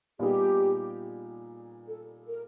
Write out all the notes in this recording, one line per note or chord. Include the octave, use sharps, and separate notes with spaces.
A#2 G3 B3 D#4 G4 G#4
A4
A#4